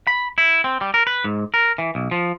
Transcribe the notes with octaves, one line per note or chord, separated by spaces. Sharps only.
B5
E4
C4
G3
A#4
B4
G#2
A#4
E3
B1
F3